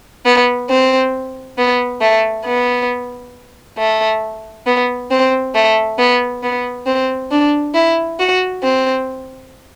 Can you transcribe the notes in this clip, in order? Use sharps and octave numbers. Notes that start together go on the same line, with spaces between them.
B3
C4
B3
A3
B3
A3
B3
C4
A3
B3
B3
C4
D4
E4
F#4
C4